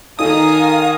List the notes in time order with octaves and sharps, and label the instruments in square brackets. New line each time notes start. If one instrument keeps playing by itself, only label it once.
[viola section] D#3 G#5 A#5 [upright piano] D#4 A4 [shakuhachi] F5 [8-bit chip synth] D#6